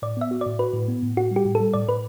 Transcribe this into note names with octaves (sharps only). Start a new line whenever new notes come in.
A2 D5
B3 E5
F#4
A2 D5
F#4 B4
A2
B3
A2
A2 F#4
G3
G4
A2
G3 A4
A2 D5
A2 B4